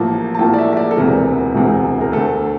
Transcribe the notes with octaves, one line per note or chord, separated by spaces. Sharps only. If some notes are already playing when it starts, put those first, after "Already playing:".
Already playing: A1 A2 F3 A#3 A5
A5
A1 A2 F3 A#3 G5
D5
E5
E5
D5
A4
E1 D2 C3 E3 A#4
E1 D2 C3 E3
A#4
D2 D3 A3 A4